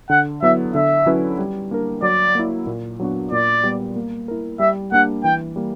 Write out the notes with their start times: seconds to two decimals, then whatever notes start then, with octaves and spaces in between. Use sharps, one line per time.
0.10 D3 F#5
0.42 F#3 B3 E4 E5
0.74 D3 E5
1.06 F#3 C#4 E4 B4
1.39 G3
1.71 A#3 D4 A#4
2.02 F#3 D5
2.35 A#3 E4
2.67 A#2
3.00 F#3 B3 D4 F#4
3.31 A#2 D5
3.63 G3 B3
3.96 A#3
4.28 E4 A#4
4.59 G3 E5
4.92 A#3 D4 G4 F#5
5.24 E3 G5
5.56 G3 A#3